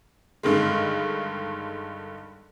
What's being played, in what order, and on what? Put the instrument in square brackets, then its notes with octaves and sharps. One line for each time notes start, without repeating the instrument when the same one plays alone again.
[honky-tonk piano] G2 D3 D#3 G#3